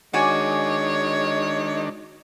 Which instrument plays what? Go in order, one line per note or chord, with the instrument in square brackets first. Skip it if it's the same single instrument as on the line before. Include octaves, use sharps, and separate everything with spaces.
[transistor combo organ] D#3 D4 [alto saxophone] G#3 [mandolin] F#4 D5 G#5 [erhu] C#5